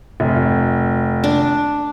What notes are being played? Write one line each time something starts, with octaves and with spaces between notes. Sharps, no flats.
F1
D4